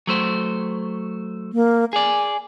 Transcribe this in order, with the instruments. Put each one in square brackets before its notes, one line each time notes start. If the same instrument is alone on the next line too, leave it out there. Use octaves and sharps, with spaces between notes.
[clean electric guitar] F#3 A3 C5
[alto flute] A#3
[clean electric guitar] G#4 D5 [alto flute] G#5